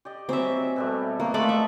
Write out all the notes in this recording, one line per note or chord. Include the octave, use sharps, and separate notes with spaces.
G4 D5 D#5
F#3 G3 C4 G#4 E5
B2 G3 A3
A#3 B3 G4
G#3 A3 A4 D5 B5
E5